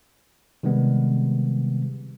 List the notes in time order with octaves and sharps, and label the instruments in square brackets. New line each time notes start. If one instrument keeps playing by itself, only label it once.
[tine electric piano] C3 D#3 G3 G#3 B3